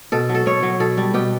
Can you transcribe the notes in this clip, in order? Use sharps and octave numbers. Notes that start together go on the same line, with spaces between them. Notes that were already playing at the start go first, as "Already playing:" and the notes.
B2 A4
F#3
A4
B2 C#5
F#3
B2 A4
G3
B2 G4